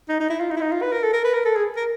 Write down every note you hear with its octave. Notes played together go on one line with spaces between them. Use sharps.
D#4
D#4
E4
F4
D#4
E4
D#4
F4
B4
A#4
A4
A#4
B4
A#4
A4
G#4
A#4